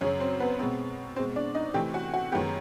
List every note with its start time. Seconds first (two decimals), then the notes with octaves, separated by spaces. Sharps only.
0.01 F#2 C#3 F#3 C#4 C#5
0.20 C4 C5
0.40 B3 B4
0.59 B2 G#3 C4
1.16 B2 G#3 C4 C5
1.36 D4 D5
1.55 D#4 D#5
1.74 C3 E3 A3 C4 G4 G5
1.94 F#4 F#5
2.14 F#4 F#5
2.32 F#2 D#3 G#3 B3 G4 G5